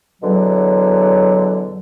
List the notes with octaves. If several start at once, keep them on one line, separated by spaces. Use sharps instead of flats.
E2 B2 D3 F#3